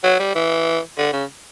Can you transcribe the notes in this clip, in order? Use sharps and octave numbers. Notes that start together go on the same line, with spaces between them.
F#3
G3
E3
D3
C#3